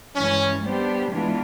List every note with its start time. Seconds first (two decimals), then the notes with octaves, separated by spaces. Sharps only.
0.15 G2 E3 G#3 C#4
0.63 G3 B3 D4 G4 C5
1.12 E3 G#3 B3 D4 F4